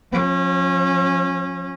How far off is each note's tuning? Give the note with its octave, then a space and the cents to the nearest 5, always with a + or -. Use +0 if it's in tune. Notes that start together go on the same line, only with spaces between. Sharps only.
F3 +30 C#4 -25